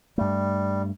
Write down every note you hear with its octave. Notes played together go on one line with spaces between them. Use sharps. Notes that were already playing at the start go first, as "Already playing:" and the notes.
G2 G3 A3